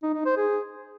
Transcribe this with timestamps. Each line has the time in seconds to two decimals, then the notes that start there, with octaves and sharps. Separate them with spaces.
0.03 D#4
0.14 D#4
0.26 C5
0.37 G#4